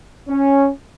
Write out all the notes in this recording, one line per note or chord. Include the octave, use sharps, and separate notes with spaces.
C#4